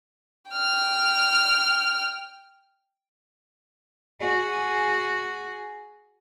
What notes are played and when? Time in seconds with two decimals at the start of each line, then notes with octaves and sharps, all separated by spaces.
0.51 G5 F6
4.20 F#4 G#4